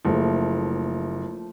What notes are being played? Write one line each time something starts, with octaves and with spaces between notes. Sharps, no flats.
F#1 F3 A3 A#3